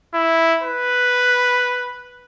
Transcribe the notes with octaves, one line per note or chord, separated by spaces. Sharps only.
E4
B4